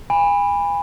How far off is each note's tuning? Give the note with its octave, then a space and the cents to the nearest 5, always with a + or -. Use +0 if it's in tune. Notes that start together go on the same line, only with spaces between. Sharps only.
G#5 -35 B5 +0